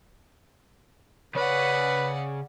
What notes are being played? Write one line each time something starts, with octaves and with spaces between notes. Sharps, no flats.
C#3 B4 C#5 D5 F#5